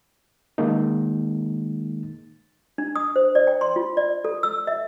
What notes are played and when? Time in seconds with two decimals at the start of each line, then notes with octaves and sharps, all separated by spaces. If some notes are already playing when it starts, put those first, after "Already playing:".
0.58 D#3 G#3 A#3 D#4
2.78 D4
2.96 D#6
3.16 C5
3.35 D5
3.47 G5
3.61 C6
3.76 F4
3.97 D5
4.25 A4
4.43 E6
4.67 E5